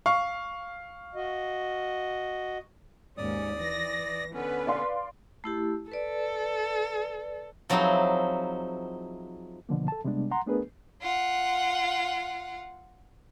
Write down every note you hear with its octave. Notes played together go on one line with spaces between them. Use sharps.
F5 C#6
F#4 D#5
D#2 G#2 C#4 D5 D#6
E3 A#6
D3 B3 C#4 B4
D5 F5 C6
A3 E4 G4
A4 B4 D5
F3 F#3 C4 D#4 E4 G#4
B2 D3 F3 A#3
A4 A5
C3 G3 G#3 B3 D4
F#5 A#5 C6
A3 B3 D4 G#4 A#4 B4
F4 F#5